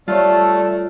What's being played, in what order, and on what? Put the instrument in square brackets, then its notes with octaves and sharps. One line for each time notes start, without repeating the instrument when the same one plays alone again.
[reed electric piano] G3 C#5 [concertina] A3 A4 [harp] F4 [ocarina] D5